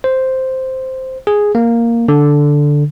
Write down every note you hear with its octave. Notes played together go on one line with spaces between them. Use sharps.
C5
G#4
A#3
D3